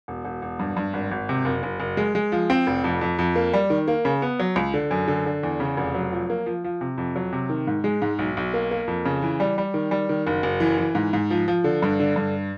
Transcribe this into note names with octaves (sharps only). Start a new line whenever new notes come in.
E1
E1
E1
G2
G2
G#1
G#1
C3
F#1
F#1
F#1
G#3
G#3
F3
C4
F1
F2
F2
F2
A#3
G3
D#3
A#3
C#3
B3
F#3
C#2
D3
F#2
D3
D3
E2
C#3
F1
F#3
F3
A#3
F3
F3
C3
F2
F#3
C3
D#3
G#2
G#3
G#2
B1
B1
A#3
A#3
F2
C#3
E3
G3
G3
D#3
G3
D#3
F#1
F#1
E3
E3
G#2
G#2
F3
F3
D3
G2
D3
G2